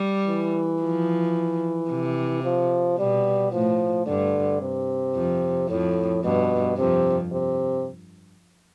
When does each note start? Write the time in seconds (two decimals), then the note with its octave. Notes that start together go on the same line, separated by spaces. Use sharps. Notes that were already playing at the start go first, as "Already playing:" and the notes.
Already playing: G3
0.27 E3
0.82 F3
1.90 C3
2.44 F3
2.98 B2 G3
3.52 A2 F3
4.06 G2 D3
4.61 C3
5.15 F2
5.69 F2 A2
6.23 G2 B2
6.77 F2 C3
7.32 C3